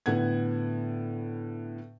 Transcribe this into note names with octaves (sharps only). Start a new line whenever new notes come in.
A2 D3 B3 F#5 G#6